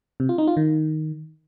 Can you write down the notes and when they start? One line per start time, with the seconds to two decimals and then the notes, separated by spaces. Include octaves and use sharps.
0.20 C3
0.29 F4
0.38 D#4
0.47 F4
0.57 D#3